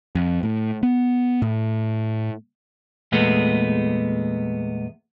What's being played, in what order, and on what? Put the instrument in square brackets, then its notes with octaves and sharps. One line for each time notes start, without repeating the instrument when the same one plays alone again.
[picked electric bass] F2
A2
B3
A2
[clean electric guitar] E2 A#2 G#3 A3 B3